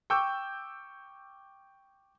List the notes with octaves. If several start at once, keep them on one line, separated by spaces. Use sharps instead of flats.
G5 C#6 D6 E6 G6